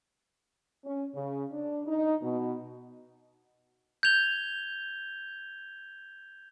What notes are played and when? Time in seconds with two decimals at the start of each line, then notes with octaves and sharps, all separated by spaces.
0.85 C#4
1.15 C#3
1.51 D4
1.87 D#4
2.23 B2
4.03 G6 G#6 F7 G7